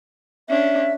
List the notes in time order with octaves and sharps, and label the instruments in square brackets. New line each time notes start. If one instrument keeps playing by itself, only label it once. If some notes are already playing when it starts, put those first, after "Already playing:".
[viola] C#4 D4 [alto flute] E5